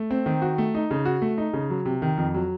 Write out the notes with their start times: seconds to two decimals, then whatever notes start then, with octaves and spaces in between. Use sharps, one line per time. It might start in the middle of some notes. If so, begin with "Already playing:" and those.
Already playing: A3
0.11 C4
0.26 D#3
0.42 F#4
0.58 A3
0.75 D#4
0.91 C#3
1.05 F#4
1.22 A3
1.38 D#4
1.53 C#3
1.70 F#3
1.85 C3
2.02 D#3
2.17 F2
2.34 F#3